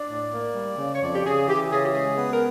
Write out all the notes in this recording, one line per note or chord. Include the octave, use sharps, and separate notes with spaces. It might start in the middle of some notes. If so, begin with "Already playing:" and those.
Already playing: D4 D5
A2
A#3
G3
C#3
C#5
F2 D5
G4
C#3 G#4
E3 G4
C#3 G#4
G4
G#3 G#4
B3
A#4